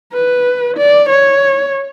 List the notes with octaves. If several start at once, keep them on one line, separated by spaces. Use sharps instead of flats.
B4
D5
C#5